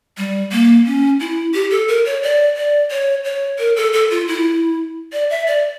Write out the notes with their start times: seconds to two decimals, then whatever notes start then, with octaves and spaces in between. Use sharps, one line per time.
0.17 G3
0.52 A#3
0.86 C#4
1.20 E4
1.54 G4
1.71 A4
1.88 A#4
2.06 C#5
2.23 D5
2.57 D5
2.91 C#5
3.24 C#5
3.59 A#4
3.76 A4
3.93 A4
4.10 F4
4.28 E4
5.13 D5
5.30 E5
5.47 D5